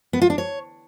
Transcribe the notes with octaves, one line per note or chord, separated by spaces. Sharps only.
B3
F4
D4
C#5